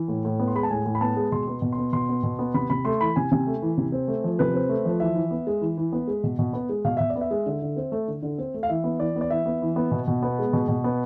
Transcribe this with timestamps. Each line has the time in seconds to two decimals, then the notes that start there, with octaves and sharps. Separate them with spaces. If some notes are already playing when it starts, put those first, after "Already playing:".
Already playing: E3
0.08 A2
0.25 A2
0.39 B3
0.48 C6
0.55 G#3 B5
0.63 A5
0.70 A2 G#5
0.86 A2
0.95 B5
1.01 B3 A5
1.16 G#3
1.32 B2 C6
1.47 B3
1.62 B2
1.72 C6
1.78 B3
1.93 B2 C6
2.09 B3
2.23 B2
2.39 B3
2.54 C3 B5
2.70 C3 B5
2.85 A3 C6
3.01 E3 B5
3.16 C3 G#5
3.32 C3
3.47 A3
3.62 E3
3.78 C3
3.92 C4
4.08 A3
4.24 F3
4.39 C3 B4
4.54 C4
4.69 A3
4.85 F3
5.00 E3 E5
5.15 E3
5.31 B3
5.47 G#3
5.61 E3
5.77 E3
5.93 B3
6.07 G#3
6.24 B2
6.39 B2
6.53 B3
6.69 G#3
6.85 B2 F5
6.97 B2 E5
7.10 D5
7.16 B3
7.21 E5
7.31 G#3
7.46 D3
7.62 D3
7.76 C4
7.92 A3
8.08 D3
8.22 D3
8.38 C4
8.54 A3
8.63 F5
8.69 E3 E5
8.84 B3
9.00 E3 D5
9.16 B3
9.21 D5
9.30 E3 E5
9.46 B3
9.62 E3
9.76 B3
9.91 B2
10.08 B2
10.23 B3
10.39 G#3
10.53 B2
10.68 B2
10.84 B3